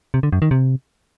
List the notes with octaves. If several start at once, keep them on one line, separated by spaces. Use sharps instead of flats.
C3
D3
F#2
D#3
C3